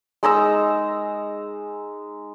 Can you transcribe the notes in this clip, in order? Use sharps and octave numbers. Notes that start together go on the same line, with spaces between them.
G#3 D#4 A#5 E6